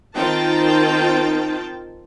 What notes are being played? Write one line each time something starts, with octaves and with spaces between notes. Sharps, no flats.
D#3 C4 D#4 F4 G5 A5